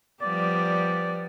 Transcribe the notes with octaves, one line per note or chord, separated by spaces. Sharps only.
F3 G3 B3 D5